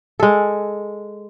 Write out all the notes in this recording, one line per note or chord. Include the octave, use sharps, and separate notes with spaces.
G#3 A4